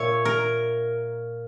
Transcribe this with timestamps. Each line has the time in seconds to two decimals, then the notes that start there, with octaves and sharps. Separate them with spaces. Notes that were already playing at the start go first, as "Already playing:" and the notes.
Already playing: A#2 C#5 E5
0.25 A#4